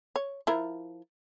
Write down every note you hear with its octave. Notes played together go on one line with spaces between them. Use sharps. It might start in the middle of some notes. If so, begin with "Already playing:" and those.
C#5
F3 E4 A#4